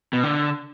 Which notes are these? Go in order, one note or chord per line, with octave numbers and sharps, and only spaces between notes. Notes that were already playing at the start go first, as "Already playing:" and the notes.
B2
D3